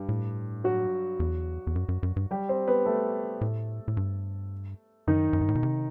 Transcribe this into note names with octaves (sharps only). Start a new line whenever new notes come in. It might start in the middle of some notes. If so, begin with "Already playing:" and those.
Already playing: G2 G3
A2
F#3 F#4
E2
E2
F#2
F#2
F#2
G2
G3 G4
C4 C5
B3 B4
A3 A4
A2
A2
G2
F#2 D#3 D#4
F#2
G2
A2
B2
C3